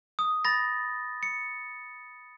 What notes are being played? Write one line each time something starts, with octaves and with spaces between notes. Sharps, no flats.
D#6
B5 A6 A#6
C#7